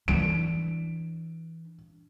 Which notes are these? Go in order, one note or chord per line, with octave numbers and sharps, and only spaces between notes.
E3 D4 D7